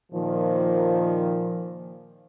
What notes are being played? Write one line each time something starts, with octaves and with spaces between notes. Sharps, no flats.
A#2 D#3 F3